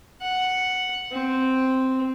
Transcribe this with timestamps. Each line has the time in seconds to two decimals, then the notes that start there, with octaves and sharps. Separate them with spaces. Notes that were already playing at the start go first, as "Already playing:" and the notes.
0.22 F#5
1.12 C4